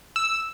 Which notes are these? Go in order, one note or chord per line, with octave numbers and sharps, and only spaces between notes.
E6